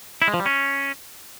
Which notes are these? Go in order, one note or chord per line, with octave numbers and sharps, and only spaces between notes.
E4
G#3
F3
G3
C#4